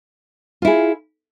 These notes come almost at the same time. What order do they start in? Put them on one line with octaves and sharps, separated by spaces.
F4 E4 G#4